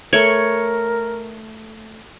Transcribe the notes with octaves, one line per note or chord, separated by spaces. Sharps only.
A3 A#4 C#5